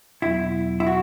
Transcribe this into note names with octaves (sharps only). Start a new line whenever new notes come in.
E2 B2 F#3 B3 E4
E4
F#4